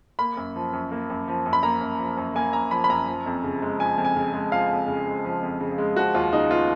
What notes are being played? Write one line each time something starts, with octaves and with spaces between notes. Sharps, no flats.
A#3 B5
F#2
F3
F#2
A#3
F#2
F3
F#2
B5
A#3 A#5
F#2
F3
F#2
A#3 G#5
F#2 A#5
F3 B5
B5
F#2 A#5
F3
F2
C#3
G#3
F3 G#5
F2
G#5
C#3
G#3
F3 F5
F2
C#3
G#3
F3
F2
C#3
G#3
F3 F#4
D#2 F4
C#3 D#4
B3 F4